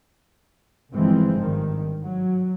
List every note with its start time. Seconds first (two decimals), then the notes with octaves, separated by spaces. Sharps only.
0.93 G1 G2 E3 F3 G#3 C4
1.39 G#1 G2 D#3
2.04 F#3